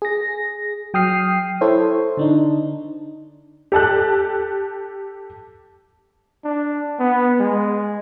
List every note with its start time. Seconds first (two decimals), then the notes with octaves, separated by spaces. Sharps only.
0.02 G#4 A#6
0.94 F#3 G5 D#6 F6 C7
1.61 E4 A4 C5 C#5
2.17 D3 D4 D#4
3.72 G4 A4 A5 F#6
6.45 D4
7.00 B3
7.40 G#3